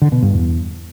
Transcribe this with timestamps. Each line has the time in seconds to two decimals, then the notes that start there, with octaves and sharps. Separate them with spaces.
0.02 D3
0.12 B2
0.23 G2
0.33 E2